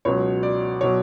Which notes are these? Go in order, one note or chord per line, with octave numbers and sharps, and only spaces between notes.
C#2 B2 F#3 C#5
D5
B2 F#3 C#5